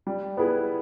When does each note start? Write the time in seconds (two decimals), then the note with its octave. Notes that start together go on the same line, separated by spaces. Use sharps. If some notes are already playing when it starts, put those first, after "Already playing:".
0.07 G3
0.37 B3 E4 G#4 B4